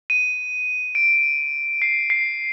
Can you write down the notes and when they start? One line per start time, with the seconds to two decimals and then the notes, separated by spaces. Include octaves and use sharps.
0.10 D#7
0.95 D7
1.82 C7
2.10 C7